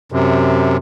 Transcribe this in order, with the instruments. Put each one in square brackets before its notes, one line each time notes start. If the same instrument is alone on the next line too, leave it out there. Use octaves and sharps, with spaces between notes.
[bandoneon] F#2 C3